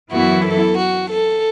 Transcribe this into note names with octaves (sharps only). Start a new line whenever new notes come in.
F#2 E3 B3 E4 F#4
A4
F#4
A4